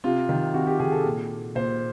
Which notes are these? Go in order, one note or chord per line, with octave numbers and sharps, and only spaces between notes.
C3 F4
D#3
C3 F#4
G4
D#3 G#4
A4
A#2
A#2 C5